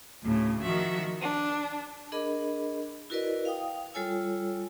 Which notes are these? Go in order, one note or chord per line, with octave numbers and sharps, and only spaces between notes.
D2 A2 C#3
D#3 F3 F#4 E5
D4
D4 G#4 A#4 D#5 B5
E4 F#4 A#4 B4 D5 D#5
F5 G5 D#6
G3 F4 A4 C#5 G#5 E6